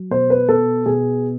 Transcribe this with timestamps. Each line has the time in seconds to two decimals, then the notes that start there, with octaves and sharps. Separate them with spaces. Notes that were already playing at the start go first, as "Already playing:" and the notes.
Already playing: F#3
0.11 B2 C5
0.30 B4
0.49 B2 A4
0.86 B2 G#4